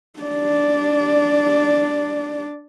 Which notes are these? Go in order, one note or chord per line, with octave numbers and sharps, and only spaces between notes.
D4 D5